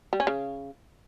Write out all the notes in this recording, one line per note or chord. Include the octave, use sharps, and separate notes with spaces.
G3
C#4
C#3